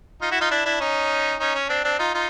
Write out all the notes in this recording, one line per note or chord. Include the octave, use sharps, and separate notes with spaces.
D#4 F4
E4 F#4
D#4 F4
D4 E4
D4 E4
C#4 D#4
C#4 D#4
C#4
C4 D4
C4 D4
D#4 F4
D#4 F4